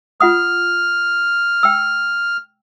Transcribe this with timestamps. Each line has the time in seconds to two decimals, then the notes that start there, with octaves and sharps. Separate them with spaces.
0.20 F4 F#5 D#6 F6
1.63 G5 E6